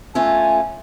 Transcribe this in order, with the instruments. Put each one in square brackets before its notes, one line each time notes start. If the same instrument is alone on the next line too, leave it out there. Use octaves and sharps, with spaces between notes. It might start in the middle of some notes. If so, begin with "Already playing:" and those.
[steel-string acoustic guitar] A3 C#4 F4 [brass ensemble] G#5